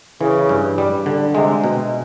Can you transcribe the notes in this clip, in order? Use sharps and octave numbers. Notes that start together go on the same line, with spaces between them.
C#3 E3
G2
G3
D3
C3 G#3
B2